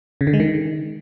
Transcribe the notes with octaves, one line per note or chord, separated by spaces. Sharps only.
C#3
D3
G#3
D#3